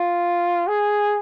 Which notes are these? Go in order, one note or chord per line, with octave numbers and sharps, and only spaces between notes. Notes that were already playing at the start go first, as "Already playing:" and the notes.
Already playing: F4
G#4